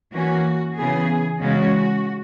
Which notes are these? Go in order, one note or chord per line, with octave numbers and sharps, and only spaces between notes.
E3 A#3 C#4 F#4
C#3 E3 B3 G#4
C#3 E3 G#3 C#4 F#4